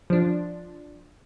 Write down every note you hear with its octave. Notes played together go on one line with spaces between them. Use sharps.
F3 D4